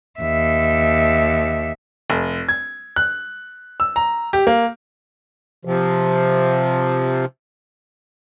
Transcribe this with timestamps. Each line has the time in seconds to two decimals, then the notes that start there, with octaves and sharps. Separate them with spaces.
0.20 D#2 E5
2.10 F1
2.49 G#6
2.96 F#6
3.80 E6
3.96 A#5
4.33 G4
4.47 A#3
5.65 C3 F3